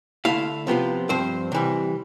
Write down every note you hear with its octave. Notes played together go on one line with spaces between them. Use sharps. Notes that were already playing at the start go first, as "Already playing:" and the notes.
D3 A3 E4 F5
C3 F3 B3 F4
G2 F3 C4 C5
C3 E3 G3